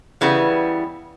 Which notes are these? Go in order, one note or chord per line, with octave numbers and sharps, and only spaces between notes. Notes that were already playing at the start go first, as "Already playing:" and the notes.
C#3 E3 G3 B3